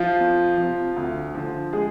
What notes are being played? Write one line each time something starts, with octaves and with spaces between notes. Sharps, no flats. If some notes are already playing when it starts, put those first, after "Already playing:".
Already playing: F3 F4
F2
C3 F3
D2
D3 F3
G#3 G#4